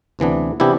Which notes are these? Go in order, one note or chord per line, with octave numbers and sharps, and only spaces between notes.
D2 C3 E3 B3 D4
C3 E3 B3 D4 E4 G4